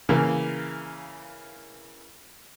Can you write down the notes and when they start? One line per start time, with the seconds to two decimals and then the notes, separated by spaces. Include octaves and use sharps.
0.09 C#3 E3 A#3